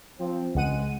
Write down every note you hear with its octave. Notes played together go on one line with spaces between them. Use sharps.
F3 C4
C#2 G#3 F#5 D#7